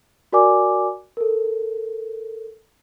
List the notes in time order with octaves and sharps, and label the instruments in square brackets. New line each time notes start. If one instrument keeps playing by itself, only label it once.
[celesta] F#4 A#4 D5 G#5 D6
A4 A#4